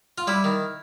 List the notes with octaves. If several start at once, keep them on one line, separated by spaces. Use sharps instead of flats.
F4
G3 E4
D#3